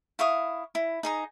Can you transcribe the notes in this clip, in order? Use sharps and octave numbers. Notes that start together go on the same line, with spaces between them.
E4 F5 C#6 D#6
E4
D#4 G#4 A#5